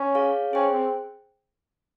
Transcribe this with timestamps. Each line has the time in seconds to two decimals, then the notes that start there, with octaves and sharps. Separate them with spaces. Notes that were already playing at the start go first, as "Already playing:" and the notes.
Already playing: C#4
0.15 G#4 C#5 F5
0.53 C#4 G#4 C5 G5
0.72 C4